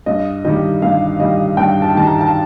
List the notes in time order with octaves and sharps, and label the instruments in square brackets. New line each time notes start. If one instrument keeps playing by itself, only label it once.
[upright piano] G2 D#5
D#3 G3 D#5
G2 F5
D#3 G3 D#5
G2 G5
A5
D#3 G3 A5
A#5
A5